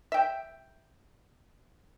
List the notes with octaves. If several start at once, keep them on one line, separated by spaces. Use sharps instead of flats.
E5 G5